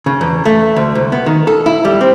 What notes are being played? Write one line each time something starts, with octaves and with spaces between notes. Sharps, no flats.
C#3
E2
A3
D2
C2
B3
D#3
A4
E4
G3
C4